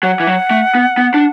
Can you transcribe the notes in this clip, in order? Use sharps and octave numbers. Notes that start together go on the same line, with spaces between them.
F#3 F#5
E3
F#3
A3
B3
B3
D4